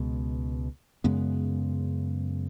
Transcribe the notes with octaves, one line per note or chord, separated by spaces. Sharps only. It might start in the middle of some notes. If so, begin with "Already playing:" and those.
Already playing: C#2 B2 G#3
F#2 C#3 G#3 B3